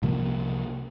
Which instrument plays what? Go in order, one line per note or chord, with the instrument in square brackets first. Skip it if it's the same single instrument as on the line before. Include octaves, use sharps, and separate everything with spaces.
[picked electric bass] C2 C3 F3 A#3